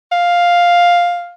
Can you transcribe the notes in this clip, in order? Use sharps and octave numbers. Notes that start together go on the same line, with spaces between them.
F5